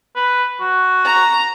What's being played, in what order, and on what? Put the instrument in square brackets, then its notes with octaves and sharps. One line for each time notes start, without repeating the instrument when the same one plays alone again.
[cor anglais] B4
F#4
[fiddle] A#5